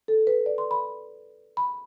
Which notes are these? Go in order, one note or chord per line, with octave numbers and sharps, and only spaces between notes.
A4
B4
D5
C6
B5
B5